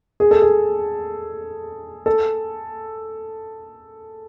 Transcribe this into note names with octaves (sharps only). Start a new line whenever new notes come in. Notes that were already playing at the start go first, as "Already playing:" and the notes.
G#4
A4
G#4
A4